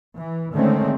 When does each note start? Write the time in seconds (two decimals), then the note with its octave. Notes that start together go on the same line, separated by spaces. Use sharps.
0.17 E3
0.54 D3 D#3 G#3 A3 C4 C#4